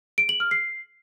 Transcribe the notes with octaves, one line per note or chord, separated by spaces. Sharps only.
D7
F#7
F6
C7